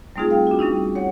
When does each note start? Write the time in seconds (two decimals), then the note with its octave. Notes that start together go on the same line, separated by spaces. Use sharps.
0.16 G3 A3 C4 D#4 F4 G#4
0.31 F5 G5
0.47 D4 F#4
0.59 G3 C#4 D#4 E4
0.95 C#5 F#5